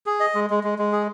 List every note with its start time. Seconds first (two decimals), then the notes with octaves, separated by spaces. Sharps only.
0.06 G#4
0.20 D#5
0.35 G#3
0.50 G#3
0.63 G#3
0.79 G#3
0.92 G#4